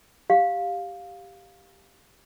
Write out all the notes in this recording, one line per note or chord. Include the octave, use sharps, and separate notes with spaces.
G4 F5